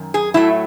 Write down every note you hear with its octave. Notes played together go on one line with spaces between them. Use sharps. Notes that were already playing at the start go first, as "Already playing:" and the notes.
Already playing: F#2 D#3
G#4
A2 F#3 A3 E4